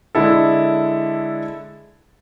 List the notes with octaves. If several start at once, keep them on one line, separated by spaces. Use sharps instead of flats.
D3 G#3 E4 A4